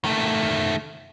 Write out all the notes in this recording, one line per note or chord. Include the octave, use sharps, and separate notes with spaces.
D#3 A3